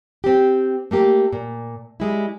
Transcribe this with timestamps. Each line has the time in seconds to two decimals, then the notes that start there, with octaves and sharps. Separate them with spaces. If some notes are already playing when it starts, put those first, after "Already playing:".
0.24 C4 G4
0.91 A3 A#3 G4
1.33 A#2
2.00 G3 G#3 E4